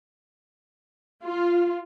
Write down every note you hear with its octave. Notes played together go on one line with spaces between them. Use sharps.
F4